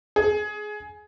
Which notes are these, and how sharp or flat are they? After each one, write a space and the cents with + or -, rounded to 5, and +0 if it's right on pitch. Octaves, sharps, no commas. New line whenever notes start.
G#4 +15